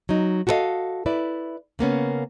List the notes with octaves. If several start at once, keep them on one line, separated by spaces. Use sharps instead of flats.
F#3 D#4
F#4 G4 A4 B4 D#5 F5
E4 B4 D5
C#3 A#3 B3 C#4